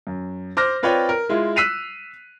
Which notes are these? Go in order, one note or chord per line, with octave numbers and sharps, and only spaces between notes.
F#2
C5 D6 F6 A#6
C4 F4 B4 C#5 D5 G5
A#4
G#3 E4 F4
E6 F#6 B6 C7 D#7 F7